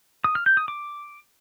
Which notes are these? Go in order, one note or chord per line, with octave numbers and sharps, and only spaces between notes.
D#6
F6
G6
D#6
D6